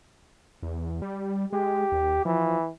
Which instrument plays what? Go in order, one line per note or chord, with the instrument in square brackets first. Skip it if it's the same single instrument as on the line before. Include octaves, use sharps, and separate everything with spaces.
[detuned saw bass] E2
G3
[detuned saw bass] G#3 [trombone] G4
[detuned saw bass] D#2
[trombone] E3 [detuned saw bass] F3